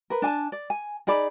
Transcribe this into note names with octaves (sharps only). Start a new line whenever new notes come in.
A#4 B4
D4 G#5 A5
D5
G#5
D#4 G#4 D5 B5